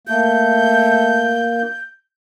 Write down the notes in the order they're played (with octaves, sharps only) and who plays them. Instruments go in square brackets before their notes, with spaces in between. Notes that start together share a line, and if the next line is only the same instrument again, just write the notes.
[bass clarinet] A3 [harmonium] A#3 [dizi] G6